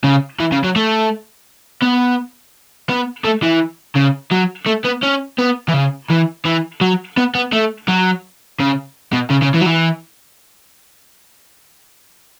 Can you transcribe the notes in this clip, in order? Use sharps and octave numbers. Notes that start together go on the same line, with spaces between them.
C#3
E3
C#3
F#3
A3
B3
B3
A3
E3
C#3
F#3
A3
B3
C#4
B3
E3
C#3
E3
E3
F#3
B3
B3
A3
F#3
C#3
B2
C#3
C#3
E3
F#3
E3